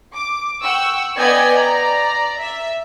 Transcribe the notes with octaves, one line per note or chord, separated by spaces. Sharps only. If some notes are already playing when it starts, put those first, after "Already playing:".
D6
F#5 G5 C#6 E6
B3 D5 D#5 G5 G#5 G#6
D5 A#5
E5